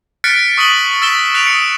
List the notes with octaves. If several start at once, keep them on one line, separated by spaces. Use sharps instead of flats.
F6 F#6 A6 B6 C#7 D7
C#6 D#6 B6 D#7 F#7 G7
E6 A6 B6 E7 G7
F#6 B6 D7 E7 F7
D#6 C#7